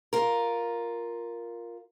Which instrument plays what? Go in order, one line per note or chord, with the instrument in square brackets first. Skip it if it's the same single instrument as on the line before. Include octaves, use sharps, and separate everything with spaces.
[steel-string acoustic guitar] F4 A#4